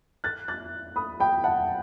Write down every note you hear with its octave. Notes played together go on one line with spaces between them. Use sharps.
F#6 A6
F#6 A6
B5 D#6
G5 B5
F#5 A5